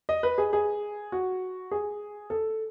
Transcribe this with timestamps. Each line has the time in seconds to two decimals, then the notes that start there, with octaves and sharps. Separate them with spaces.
0.09 D#5
0.23 B4
0.38 G#4
0.53 G#4
1.12 F#4
1.71 G#4
2.30 A4